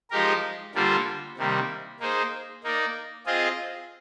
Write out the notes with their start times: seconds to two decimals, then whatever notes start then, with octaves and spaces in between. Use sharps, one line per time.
0.11 F3 G#3 D#4 G4 A#4
0.75 D3 G3 A#3 F4 C5
1.37 C3 D#3 G3 A#3
2.00 A#3 D#4 G#4 C5
2.63 A#3 D#4 A#4 D5
3.26 C4 F4 G#4 D#5